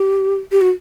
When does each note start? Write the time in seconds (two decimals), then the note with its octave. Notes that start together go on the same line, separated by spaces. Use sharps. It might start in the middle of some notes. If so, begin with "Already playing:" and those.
Already playing: G4
0.52 G4
0.61 F#4